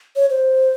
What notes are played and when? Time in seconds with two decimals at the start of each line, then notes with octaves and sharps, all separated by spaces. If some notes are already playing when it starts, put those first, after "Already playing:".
0.16 C#5
0.30 C5